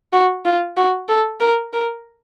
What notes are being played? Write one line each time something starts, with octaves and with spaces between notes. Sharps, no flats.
F#4
F4
F#4
A4
A#4
A#4